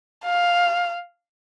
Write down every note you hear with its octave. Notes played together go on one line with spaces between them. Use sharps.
F5